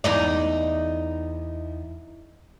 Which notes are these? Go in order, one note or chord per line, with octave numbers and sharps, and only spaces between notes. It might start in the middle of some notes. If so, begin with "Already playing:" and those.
E2 D#4 D5